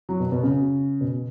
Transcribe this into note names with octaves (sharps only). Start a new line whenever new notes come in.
F#3
B2
B2
C#3
B2